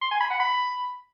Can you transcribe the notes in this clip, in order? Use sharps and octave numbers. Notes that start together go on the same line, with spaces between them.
C6
G#5
B5
F#5
B5